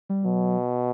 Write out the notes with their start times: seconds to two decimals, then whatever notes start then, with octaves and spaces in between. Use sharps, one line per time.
0.10 G3
0.24 B2 F#3